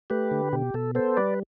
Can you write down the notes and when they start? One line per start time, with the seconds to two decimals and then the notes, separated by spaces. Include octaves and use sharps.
0.10 A3 G4 B4
0.31 D3
0.53 B2 G4
0.74 B2 A4
0.95 B3 A4 C5
1.17 G3 B4 D5